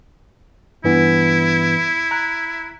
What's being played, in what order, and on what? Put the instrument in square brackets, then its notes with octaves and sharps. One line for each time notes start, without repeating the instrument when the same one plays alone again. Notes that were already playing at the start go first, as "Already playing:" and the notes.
[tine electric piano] G2 E3 B3 [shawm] E4
[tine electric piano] A#5 F#6